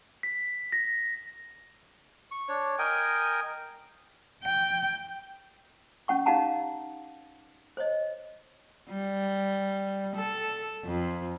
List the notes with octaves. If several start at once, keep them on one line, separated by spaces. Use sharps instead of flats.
B6
A#6
C#6
D4 C#5
A#4 D#5 G5 G#5
G5
C#4 F#5 C#6
D#4 G4 F5 F#5 A5 A#5
C5 C#5 D#5
G3
A4
F2